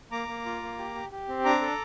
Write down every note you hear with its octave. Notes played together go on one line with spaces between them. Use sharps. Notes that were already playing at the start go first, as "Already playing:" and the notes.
A#3 A#5 D6
A#3
F4
A#3
G4
G4
G4
C4
D4 A#5 D6
A4